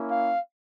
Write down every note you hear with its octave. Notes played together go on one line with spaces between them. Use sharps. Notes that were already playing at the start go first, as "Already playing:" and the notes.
Already playing: A#3 C#4 E4
F5